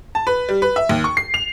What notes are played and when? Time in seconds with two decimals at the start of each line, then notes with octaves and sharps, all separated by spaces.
0.15 A5
0.27 B4
0.49 G3
0.62 B4
0.76 E5
0.89 D#2
1.04 C#6
1.17 C7
1.34 F7